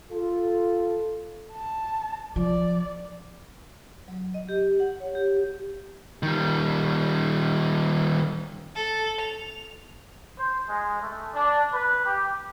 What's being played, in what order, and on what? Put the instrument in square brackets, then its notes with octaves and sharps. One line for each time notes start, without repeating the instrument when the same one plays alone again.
[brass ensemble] F4 A4
[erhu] A5
[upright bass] F3 [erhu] D5
[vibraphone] F#3
D#5
G4
F#5
C#5
G4
[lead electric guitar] D#3 G3
[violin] A4
F7
[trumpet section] C5
G#3
A3
D4
B4
G4